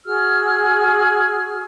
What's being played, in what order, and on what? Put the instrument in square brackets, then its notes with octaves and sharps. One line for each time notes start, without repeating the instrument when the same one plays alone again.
[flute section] F#4 G#4 E6 F6